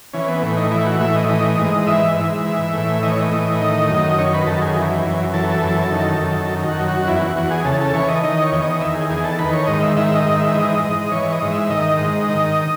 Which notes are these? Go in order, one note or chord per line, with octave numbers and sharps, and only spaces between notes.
E3 C#4
B3
A2
D#4
E3 E4
F#4
A2 E5
D#5
E3 D#5
G#2
E3 E5
G#2
E3
A2
E3 D#5
C#5
D#5
A2
D#3
F#2
D#3 C#5
B4
F#2 A4
G#4
E3
F#2
E3 A4
F#2
D#3
F#2
D#3
F#4
F#2
F#4
E2 E4
F#4
E2 F#4
G#4
C#3 A4
A4
E3 C#5
D#5
D#3 D#5
C#5
E2
D#5
D#3 E5
G#4
E2 G#4
A4
D#3 B4
C#5
G#2 D#5
E5
D#3 E5
D#5
G#2
E5
E3 D#5
G#2
E3 C#5
D#5
G#2
E5
D#3 D#5
G#2
D#3